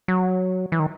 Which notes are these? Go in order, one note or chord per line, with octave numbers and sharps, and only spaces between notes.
F#3
E3
D#3